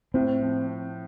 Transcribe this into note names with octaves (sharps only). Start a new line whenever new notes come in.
A2 C4
F3